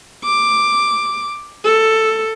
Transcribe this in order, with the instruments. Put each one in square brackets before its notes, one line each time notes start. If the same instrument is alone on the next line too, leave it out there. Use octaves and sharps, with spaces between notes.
[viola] D6
A4